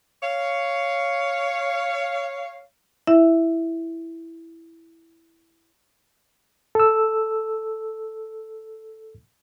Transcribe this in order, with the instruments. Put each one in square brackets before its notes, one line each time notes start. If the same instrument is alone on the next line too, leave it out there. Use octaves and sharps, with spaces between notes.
[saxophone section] C#5 F5
[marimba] E4 E5
[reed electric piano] A4 E6